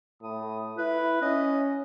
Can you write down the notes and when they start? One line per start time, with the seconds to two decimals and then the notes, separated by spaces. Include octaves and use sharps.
0.22 A2 D#6
0.78 E4 B4
1.22 C#4 D#5